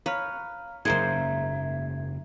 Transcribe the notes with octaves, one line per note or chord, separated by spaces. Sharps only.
B4 C#5 F5 A#5 F6
F#1 G#2 G#3 A#3 C5 E5 G#6